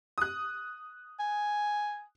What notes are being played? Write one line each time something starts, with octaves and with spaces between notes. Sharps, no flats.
D#6 F#6
G#5